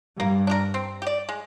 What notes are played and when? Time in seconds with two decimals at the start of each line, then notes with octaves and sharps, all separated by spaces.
0.19 G2 A#3
0.47 D4 G4 A#4
0.74 C4
1.02 G4
1.07 D5
1.29 G#3